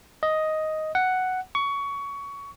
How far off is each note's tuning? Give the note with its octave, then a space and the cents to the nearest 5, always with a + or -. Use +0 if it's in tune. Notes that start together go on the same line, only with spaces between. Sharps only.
D#5 +5
F#5 +5
C#6 +20